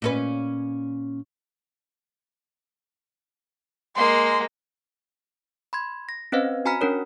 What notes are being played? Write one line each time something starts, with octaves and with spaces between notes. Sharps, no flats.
A#2 C#4 B4
G#3 A#3 C6
B5 C6 G#6
A#6
C4 C#4 B4 C5 D#5 F5
F#4 G#5 A#5 B5 F6 B6
C#4 D4 A#4 C#5